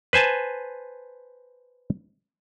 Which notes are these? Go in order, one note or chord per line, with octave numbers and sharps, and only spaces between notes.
B4 C5 G#5 A5